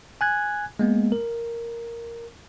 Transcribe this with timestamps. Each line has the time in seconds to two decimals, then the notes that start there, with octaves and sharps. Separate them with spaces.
0.21 G#5 F#6 G#6
0.79 G#3 A#3 B3
1.12 A#4